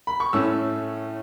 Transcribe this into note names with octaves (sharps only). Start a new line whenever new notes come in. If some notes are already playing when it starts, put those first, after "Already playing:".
B5
C#6
A2 A3 C#4 E6